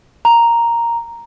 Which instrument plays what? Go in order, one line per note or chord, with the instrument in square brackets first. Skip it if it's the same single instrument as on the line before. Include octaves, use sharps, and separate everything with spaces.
[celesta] A#5